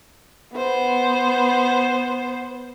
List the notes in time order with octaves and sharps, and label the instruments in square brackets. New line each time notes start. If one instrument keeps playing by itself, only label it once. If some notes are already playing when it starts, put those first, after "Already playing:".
[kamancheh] B3 C5